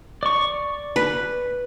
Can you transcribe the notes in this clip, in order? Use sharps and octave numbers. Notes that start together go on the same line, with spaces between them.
D5 C#6
B4